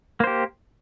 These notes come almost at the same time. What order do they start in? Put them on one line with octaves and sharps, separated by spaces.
A#3 C5 G4